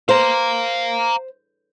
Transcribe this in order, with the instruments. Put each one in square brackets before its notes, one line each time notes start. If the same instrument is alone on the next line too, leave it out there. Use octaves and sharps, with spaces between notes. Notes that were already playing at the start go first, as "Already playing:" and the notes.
[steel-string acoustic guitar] C5 [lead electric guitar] F5 A#5